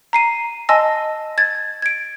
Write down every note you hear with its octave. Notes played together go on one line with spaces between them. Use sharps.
A#5 C7 D#7
D#5 G#5 A5 C6 E6 A#6
G#6 A6
G#6 D7